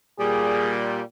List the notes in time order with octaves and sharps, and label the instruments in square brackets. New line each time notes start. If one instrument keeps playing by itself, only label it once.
[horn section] A#2 G3 [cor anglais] G#4